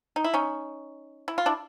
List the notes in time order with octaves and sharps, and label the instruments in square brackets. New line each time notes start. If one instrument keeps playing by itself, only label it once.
[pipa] D#4
E4
C#4 D#4
E4
F4
D4 E4